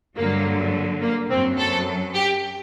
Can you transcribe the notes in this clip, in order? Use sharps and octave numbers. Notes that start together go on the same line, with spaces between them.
G2 D3 F#3 A#3
A#3
F#2 F#3 C4
A4
G4